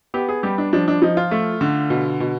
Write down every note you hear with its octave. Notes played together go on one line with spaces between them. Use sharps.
B3 G4
G#4
G3 G4
D4
F3 D4
D4
F3 D#4
F4
A3
D3
B2
B2